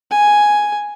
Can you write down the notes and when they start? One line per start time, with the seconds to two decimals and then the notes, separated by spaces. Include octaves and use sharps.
0.11 G#5